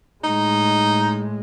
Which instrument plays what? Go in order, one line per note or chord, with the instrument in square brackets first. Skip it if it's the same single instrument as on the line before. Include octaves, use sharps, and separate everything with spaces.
[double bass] A2 G#3 [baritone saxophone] D#4